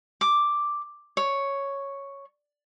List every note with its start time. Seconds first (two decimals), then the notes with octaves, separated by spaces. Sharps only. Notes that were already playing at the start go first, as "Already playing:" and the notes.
0.21 D6
1.17 C#5